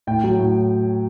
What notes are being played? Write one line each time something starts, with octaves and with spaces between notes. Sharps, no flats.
A2 G5
F#3
A2